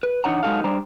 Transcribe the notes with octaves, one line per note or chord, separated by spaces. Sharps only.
B4
E3 D4 D#4 C#5 F#5 A#5
F#3 G#3 D#4 F#4 A4 F5
G3 D4 C5 D5 A#5